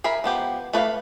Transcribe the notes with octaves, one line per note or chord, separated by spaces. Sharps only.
G#4 A#4 E5 B5
F3 B3 G4
A3 B4 C#5 F5